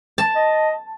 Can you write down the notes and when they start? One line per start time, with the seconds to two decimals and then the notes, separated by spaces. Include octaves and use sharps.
0.18 A5
0.36 D#5